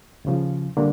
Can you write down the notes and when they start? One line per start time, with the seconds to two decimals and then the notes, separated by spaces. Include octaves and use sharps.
0.25 D#2 C#3 F3
0.77 D3 G3 A#3 D4